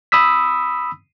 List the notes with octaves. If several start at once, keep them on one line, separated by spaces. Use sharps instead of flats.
B5 D#6 E6 B6